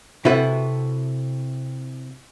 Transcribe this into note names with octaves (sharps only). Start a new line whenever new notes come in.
C3 E4 F#4 A4 B4